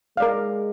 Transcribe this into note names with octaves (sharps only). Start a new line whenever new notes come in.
G#3 A#4 D5 F5